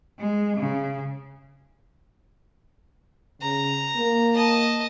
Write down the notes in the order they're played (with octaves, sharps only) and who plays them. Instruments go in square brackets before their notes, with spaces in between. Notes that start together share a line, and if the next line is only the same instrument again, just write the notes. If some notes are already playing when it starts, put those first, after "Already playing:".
[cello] G#3
C#3
[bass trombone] C#3 [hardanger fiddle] A#5
[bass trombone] A#3
[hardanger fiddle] D#5 A5